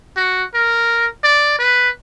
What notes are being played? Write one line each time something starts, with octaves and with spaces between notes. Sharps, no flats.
F#4
A#4
D5
B4